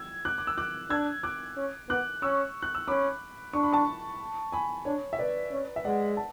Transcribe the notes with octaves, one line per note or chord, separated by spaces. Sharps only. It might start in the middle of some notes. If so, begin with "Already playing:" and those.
Already playing: E6 G#6
D6 F#6
D6
E6
D6 F#6
D4 E6 G#6
D6 F#6
C#4
B3 D6 F#6
C#4 C#6 E6
F#6
E6
C#4 B5 D6
D4 C#6
B5
A5 C#6
G#5 B5
D4 C#5
E5
B4 D5
C#4
E5
G#3 D5 F#5
A5